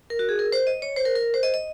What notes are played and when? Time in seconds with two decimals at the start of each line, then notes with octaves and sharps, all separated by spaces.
0.10 A#4
0.19 F#4
0.29 G#4
0.39 A#4
0.52 C5
0.67 D#5
0.82 C#5
0.97 C5
1.05 A#4
1.16 A#4
1.34 C5
1.43 D#5
1.54 D#5